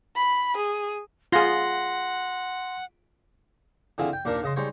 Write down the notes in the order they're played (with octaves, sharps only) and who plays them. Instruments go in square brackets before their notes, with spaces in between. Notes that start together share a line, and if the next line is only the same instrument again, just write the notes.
[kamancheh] B5
G#4
[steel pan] F4 G#4 [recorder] F#5 [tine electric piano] C6 A#6
[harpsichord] D3 E3 C4 F4 G#4
G5
D#2 A#2 D#3 D4 A#4
C#3 D#5 C6
G3 G#3 D#4 C5 C#5